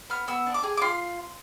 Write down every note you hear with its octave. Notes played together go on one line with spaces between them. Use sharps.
B3 F6
B3 E6
D4
D6
G#4
D6
F4 C6